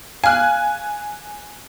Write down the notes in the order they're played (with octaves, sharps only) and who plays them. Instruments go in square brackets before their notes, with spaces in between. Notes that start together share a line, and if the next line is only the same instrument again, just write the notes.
[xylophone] F5 F6 [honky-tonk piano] G#5 F#6